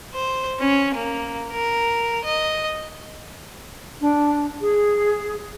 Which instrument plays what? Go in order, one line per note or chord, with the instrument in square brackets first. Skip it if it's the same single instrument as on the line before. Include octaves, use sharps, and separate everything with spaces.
[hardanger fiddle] C5
C#4
A#3
A#4
D#5
[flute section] D4
G#4